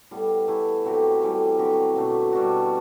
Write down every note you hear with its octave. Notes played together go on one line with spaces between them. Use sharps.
A2 G3 B3
E3 A3 E4
A2 F#3 C4 G4
A2 E3 G3
D3 F#3 C4 G4
B2 A3 D4
B2 G3 D4 F#4